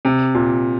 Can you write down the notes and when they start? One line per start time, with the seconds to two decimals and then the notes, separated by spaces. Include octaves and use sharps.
0.05 C3
0.35 A#2